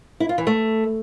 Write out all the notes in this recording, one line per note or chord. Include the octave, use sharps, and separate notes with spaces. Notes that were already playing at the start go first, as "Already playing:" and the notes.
E4
F4
E3
A3